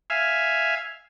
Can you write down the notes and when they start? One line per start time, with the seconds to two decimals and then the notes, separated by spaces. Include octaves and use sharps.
0.10 E5 F5 G#5